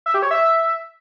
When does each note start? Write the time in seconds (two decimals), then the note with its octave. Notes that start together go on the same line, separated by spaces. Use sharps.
0.06 E5
0.14 G4
0.22 C#5
0.31 E5